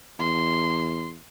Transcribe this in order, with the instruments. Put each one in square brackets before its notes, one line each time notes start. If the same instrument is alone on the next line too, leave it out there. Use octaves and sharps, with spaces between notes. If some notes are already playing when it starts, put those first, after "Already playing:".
[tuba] E2 [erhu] C6